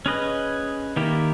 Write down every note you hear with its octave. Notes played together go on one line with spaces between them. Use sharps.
C#4 G#4 B4 D#5
D#3 A#3 E4 G4